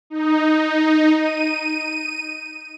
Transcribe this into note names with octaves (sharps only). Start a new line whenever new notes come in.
D#4
D#7